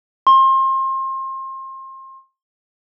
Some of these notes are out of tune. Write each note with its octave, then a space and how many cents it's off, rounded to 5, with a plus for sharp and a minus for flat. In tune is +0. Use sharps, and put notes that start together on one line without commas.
C6 +30